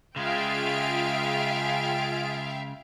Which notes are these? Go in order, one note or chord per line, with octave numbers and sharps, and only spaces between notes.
C#3 G#3 F4 G#4 E5 F5 G5 D7